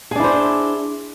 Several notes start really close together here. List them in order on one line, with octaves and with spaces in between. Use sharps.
G#4 D4 E4 C5